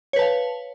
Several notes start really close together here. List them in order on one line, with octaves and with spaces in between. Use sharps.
C#5 B4 A5 F5